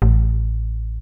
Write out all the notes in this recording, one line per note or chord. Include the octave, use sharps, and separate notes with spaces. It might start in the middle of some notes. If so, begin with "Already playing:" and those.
A1